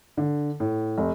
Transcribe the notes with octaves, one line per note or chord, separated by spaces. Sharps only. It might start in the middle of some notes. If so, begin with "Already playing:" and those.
D3
A2
F1